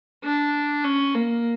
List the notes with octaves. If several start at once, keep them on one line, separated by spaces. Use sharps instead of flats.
D4
C#4
A#3